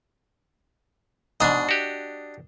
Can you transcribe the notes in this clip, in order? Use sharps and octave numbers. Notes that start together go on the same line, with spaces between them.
G#2 B2 D4 D#5
F#4 G4